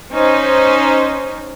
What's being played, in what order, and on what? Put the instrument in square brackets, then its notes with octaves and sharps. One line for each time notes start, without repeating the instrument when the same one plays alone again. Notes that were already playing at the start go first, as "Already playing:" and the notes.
[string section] C#4 D#4 C5